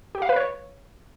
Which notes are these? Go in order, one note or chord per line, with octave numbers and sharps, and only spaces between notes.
G4
F5
B4
C#5